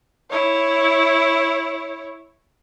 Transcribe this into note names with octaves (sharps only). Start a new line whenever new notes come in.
E4 C#5